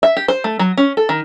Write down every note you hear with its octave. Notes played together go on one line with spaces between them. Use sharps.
E5
G4
C5
A3
F#3
C#4
A4
D#3